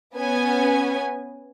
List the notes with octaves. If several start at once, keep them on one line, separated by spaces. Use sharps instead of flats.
B3 C#4 G#5